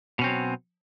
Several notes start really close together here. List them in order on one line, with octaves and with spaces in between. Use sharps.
B2 C#4 C4 F#3